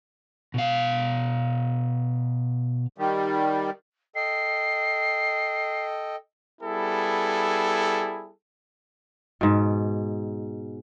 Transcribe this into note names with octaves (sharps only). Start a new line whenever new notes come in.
B2 F5
D#3 G3
A4 D#5 G5 C7
G3 B3 E4 G#4 A4
G#2 B2